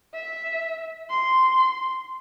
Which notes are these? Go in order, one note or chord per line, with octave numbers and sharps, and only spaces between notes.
E5
C6